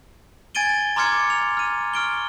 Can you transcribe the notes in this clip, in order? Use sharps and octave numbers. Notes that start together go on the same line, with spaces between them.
G#5 G#6 A6 D7 D#7 G7
A#5 C6 D6 F6 G#6 C#7
F7
F6 D#7
C#6 F6 D7 G7